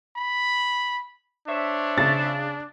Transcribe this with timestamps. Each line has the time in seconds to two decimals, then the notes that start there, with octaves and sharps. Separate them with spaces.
0.17 B5
1.48 D4 C5 C#5 E5
1.98 C#3 A6